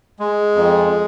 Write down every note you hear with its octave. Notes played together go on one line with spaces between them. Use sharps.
G#3
F2